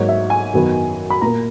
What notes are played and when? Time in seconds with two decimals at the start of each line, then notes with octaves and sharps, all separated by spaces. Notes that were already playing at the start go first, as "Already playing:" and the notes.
Already playing: G#2 F#3 A#3 C#5
0.09 E5
0.30 G#5
0.54 F#2 D#3 F#3 B3
1.10 B5
1.21 A#2 A#3 A#5